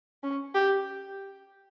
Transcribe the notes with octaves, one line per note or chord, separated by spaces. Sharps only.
C#4
G4